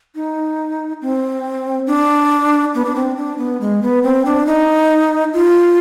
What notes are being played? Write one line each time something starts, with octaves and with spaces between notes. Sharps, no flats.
D#4
C4
D4
B3
D4
C4
D4
B3
G#3
B3
C4
D4
D#4
F4